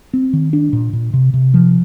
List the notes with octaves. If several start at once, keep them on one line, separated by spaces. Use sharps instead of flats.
C4
D#3
D4
A#2
A#2
C3
C3
F3